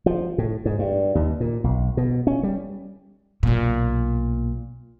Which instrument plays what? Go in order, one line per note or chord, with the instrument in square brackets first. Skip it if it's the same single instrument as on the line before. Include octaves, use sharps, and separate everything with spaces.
[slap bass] F3
A2
G#2
G2
D#2
A#2
B1
B2
C#4
G3
[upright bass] B1 A#2